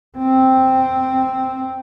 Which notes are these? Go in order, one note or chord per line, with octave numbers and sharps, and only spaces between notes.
C4